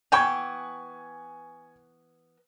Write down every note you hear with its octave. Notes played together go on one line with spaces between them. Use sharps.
E3 B3 G5 G#5 C#6 G#6